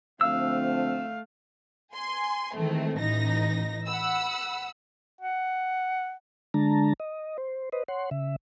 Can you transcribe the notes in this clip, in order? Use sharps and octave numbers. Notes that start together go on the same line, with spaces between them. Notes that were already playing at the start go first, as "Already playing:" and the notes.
D3 F3 A3 C4 F5 E6
G#5 C6
D#3 E3 G#3 A3 C4
A1 A2 E3 D#4 A#6
F#5 B5 E6
F#5
D3 G#3 D4 A5 A#5
D#5
C5
B4 C5 D#5
C#5 F#5 C6
C#3 E5